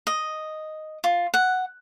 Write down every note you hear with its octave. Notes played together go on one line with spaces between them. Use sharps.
D#5
F4
F#5